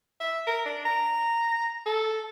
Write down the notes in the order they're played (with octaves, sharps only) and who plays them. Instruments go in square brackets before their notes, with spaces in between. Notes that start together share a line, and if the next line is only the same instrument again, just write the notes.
[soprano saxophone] E5
A#4
D4
A#5
A4